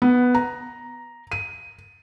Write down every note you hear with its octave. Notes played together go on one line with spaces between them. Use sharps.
B3
A#5
D#7